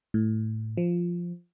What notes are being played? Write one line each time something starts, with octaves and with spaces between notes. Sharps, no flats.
A2
F3